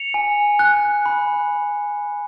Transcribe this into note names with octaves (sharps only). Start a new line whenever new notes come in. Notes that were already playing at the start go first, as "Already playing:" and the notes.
Already playing: C#7 F7
G#5
F#6
B5